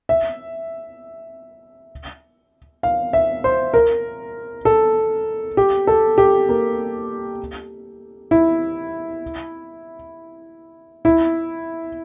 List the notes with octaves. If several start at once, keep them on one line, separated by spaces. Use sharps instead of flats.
E5
F5
E5
C5
A#4
A4
G4
A4
G4
A#3
E4
E4